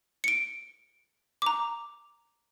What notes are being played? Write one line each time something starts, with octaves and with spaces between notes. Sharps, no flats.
C#7 D7
A#5 D6